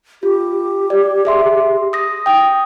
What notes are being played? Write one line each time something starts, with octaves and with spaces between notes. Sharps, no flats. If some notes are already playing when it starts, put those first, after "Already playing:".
F4 G4
D5
G#4 E5 C6
D#6 A#6
G5 D#6